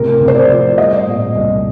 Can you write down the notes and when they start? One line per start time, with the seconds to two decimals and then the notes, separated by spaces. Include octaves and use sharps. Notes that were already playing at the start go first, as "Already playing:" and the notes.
Already playing: A2 C3 A#4
0.20 C3
0.28 C5
0.35 D5
0.49 F3
0.78 G3 D#5
1.06 A#2
1.35 C2